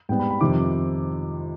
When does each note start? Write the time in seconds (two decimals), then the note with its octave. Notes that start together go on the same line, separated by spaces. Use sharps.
0.09 G#2 G3 B3 G5
0.20 B5
0.30 B5
0.41 F2 C3 D#3 D6